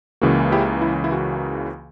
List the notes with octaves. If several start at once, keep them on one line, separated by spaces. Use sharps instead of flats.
C#2 C#3 E3 A#3 F#4
E4 G4
E4
E4
F#4